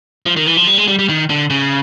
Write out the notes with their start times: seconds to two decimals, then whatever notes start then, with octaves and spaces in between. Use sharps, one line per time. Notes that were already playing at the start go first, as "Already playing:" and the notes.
0.26 F3
0.36 D#3
0.47 E3
0.57 F3
0.67 G3
0.78 G#3
0.88 G3
0.99 G3
1.09 D#3
1.30 D3
1.50 C#3